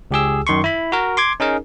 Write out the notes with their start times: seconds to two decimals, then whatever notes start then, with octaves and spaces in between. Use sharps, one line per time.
0.11 C#2 G4 G#4 E6
0.47 F#2 D#3 C6 C#6
0.64 E4 B5
0.92 F#4 A#4
1.17 C6 D6 G#6
1.40 C#4 D#4 G#4 A#4